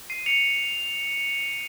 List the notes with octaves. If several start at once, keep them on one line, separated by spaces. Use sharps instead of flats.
C7 D#7
C#7 F7